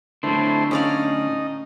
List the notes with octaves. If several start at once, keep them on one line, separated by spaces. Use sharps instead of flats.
A2 D3 A3 E4 C5
C#4 D#4 D5 F5